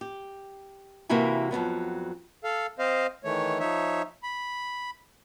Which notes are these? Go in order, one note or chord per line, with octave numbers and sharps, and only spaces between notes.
G4
C3 E3 A#3 E4 F#4 G#5
F2 G#2 F#3 B3
A4 F5
C4 C5 D#5 F5
D#3 E3 A3 C#5
F3 D#4 C#5 E5
B5